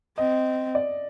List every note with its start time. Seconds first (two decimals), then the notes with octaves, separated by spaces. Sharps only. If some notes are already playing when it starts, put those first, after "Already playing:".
0.18 C4 D#5
0.75 D5